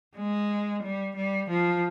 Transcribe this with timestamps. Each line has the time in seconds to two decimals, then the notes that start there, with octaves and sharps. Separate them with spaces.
0.16 G#3
0.83 G3
1.16 G3
1.50 F3